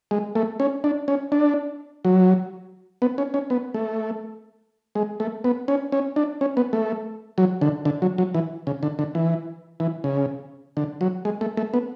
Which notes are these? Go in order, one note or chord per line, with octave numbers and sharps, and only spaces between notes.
G#3
A3
C#4
D4
C#4
D4
F#3
B3
C#4
C#4
B3
A3
G#3
A3
B3
C#4
C#4
D4
C#4
B3
A3
F#3
D3
D3
F#3
F#3
E3
C#3
D3
D3
E3
E3
C#3
D3
F#3
G#3
A3
A3
B3